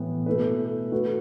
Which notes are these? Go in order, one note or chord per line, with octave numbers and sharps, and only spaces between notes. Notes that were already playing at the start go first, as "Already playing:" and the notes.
Already playing: A2 E3 B3
B2 A3 E4 B4
A3 F#4 B4